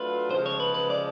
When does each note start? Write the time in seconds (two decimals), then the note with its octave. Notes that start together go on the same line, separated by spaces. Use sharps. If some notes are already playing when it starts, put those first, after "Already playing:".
Already playing: F#3 A3 D4 F4 B4
0.31 C#3 F3 G#3 C5
0.46 C#5
0.60 B4
0.74 B4
0.90 D5